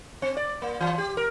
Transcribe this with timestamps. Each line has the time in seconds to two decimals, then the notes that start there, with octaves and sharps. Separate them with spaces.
0.22 C4
0.37 D5
0.62 A#3
0.80 E3
0.98 G4
1.17 A#4